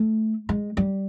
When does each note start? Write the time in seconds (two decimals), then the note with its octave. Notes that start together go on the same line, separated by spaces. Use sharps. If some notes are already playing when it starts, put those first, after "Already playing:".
Already playing: A3
0.49 G#3
0.77 G3